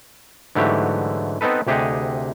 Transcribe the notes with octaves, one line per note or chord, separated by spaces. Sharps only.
G#2 D3 E3 F#3 A3 G4
B3 C4 D#4 A4 B4
D2 C3 G4 G#4 D#5 F#5